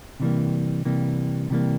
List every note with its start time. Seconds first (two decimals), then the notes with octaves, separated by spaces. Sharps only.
0.20 C3 E3 G3 A#3
0.85 C3 E3 G3 A#3
1.50 C3 E3 G3 A#3